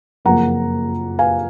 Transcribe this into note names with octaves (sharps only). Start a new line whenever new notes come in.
F#1 F2 F3 A#3 F#5 A#5
F5 G#5